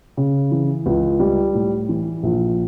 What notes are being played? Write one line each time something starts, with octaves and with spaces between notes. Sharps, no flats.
C#3
E3
C#2
G3
A2
E3
A#1